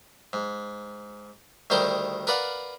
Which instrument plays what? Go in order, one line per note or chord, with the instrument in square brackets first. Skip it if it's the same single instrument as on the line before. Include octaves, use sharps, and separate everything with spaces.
[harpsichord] G#2
D2 D#3 G3 A#4 C5
A#4 B4 D5 F5 F#5